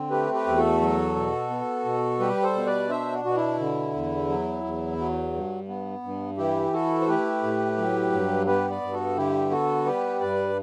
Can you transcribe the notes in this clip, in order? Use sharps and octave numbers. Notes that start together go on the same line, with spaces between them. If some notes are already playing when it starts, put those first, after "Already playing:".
Already playing: D3 C4
A3 G4 B4
G4 B4
E2
F#4 A4
F#3
B2
B3
B2
G3 G4 B4
A4 C5
B2
B4 D5
D4 C5 E5
F#4
B2 F#4
E4
D3
E2
F#3
E2
F#3
G2
B3
G2
E3 E4 G4
E4 F#4 A4
C5
A3 G4 B4
A2
F#3
G2
B3 G4 B4
B4 D5
G2
F#4 A4
D3 E4 G4
B3 F#4 A4
G3 G4 B4
G2 B4 D5